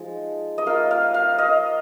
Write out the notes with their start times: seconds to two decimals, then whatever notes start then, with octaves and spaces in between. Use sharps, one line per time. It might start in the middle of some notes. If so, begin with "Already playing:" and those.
Already playing: F3 G#3 D#4
0.58 D#5
0.66 A#3 F4 F5
0.91 F5
1.14 F5
1.38 D#5